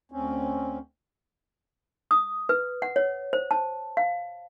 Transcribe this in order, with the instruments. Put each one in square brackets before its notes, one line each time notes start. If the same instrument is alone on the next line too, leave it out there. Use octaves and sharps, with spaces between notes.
[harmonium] D2 C4 C#4
[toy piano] D#6
B4
F#5
C#5
C5
A5
F5